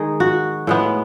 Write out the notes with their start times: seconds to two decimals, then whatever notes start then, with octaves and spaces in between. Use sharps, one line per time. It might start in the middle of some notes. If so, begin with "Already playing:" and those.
Already playing: D#3 G#3 D#4 G#4
0.20 F#4
0.67 A2 G#3 B3